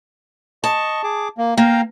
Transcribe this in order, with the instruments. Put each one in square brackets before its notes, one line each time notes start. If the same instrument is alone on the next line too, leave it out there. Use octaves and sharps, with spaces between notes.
[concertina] D#5 C#6 [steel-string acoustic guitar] A5
[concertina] G#4 D6
A#3
[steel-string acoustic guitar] A#3 [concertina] F5 G5 A#5